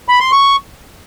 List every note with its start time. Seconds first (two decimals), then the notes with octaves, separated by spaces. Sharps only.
0.09 B5
0.20 C6
0.32 C#6